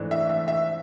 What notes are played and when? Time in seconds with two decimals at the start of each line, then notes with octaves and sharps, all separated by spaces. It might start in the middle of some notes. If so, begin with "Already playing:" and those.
Already playing: G#2 E3 A3 D4
0.11 E5
0.29 E5
0.48 E5